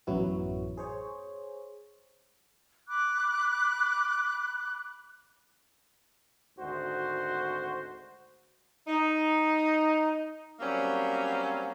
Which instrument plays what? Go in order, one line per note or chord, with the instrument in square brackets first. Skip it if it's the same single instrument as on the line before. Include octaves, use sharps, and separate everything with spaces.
[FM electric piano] A1 F#2 F#3 B3 E4 F#4
G#4 C5 C#5
[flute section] B5 D6 F#6
[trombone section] G#1 D2 F#4 C5
[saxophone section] D#4
F#3 G3 A#3 C4 C#4